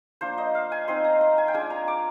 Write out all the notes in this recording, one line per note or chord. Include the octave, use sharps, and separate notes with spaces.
F3 A#3 D4 C5
D#5
F5
G#5
F3 C4 D#4 C6
A#5
C6
G#5
G5
G#3 D4 F4 G#5
A#5
D6